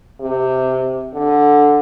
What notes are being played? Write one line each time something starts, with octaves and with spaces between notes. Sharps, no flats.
C3
D3